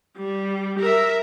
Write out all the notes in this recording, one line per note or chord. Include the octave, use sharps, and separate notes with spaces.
G3
A#4 E5